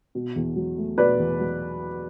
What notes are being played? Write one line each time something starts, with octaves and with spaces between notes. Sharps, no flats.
B2
E2
F#3
A3
B2 B4 D5
E2
F#3